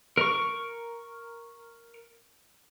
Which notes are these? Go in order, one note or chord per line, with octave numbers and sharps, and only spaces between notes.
A#4 C#6